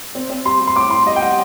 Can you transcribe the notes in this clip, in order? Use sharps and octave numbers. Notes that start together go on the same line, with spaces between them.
C4
C4
G3 C6
G3
C6
A2 D6
A2 C6
G3 D#5
G5
G3 F#5